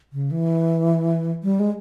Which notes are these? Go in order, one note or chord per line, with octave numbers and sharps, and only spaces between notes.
C#3
E3
G3
G#3